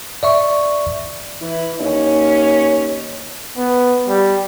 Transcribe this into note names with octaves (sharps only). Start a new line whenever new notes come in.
D5 E5 C#6
E3 E4
D#2 C#4
B3
G3